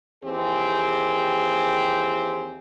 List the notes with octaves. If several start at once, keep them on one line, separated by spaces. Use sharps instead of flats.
D#2 E3 C4 G4 G#4